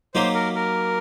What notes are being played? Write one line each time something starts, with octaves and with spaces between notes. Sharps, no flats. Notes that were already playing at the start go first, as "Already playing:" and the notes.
F#3 A#3 D#4 G4 C5
A#4
A#4